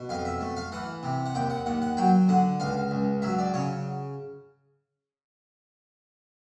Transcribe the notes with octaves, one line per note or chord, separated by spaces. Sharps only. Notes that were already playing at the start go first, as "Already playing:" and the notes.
Already playing: B2
F2 F5
E5
A3
F5
E3 F#5
C3
F#5
D#2 G5
F#5
D#2 F#5
F#5
F#3 G5
D3 F#5
C#2 F5
C#2
F#3 E5
D5
C#3 C#5